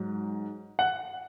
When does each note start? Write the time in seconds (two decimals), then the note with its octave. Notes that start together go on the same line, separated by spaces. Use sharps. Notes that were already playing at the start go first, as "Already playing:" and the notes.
Already playing: G#2 F#3
0.79 F#5